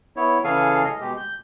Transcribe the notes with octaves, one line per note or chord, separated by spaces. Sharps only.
B3 E4 C#5
C#3 E3 G#4 A4 F5 G#5
D#5
B2 G#3 G4
G6